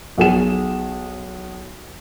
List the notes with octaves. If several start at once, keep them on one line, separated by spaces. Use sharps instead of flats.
B1 G#4 E7